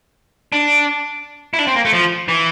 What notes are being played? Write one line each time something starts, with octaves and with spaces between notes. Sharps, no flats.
D4
E4
D4
C4
A#3
A3
F3
E3